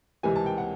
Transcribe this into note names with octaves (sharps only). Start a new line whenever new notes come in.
C#2 C3 E3 G3 G#5
A5
G5
F#5